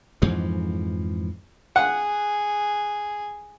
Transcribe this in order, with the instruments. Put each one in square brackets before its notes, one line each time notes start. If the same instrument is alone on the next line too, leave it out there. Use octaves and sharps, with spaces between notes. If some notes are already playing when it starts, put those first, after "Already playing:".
[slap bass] F2 G#2 E3 F3
[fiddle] G#4 [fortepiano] F#5